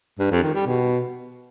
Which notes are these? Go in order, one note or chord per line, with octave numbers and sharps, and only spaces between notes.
G2
F2
D#3
G3
B2